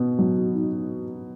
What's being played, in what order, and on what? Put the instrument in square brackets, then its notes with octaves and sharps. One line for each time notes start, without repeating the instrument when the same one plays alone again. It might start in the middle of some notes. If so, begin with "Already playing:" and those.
Already playing: [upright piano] B2 B3
F#3
D#4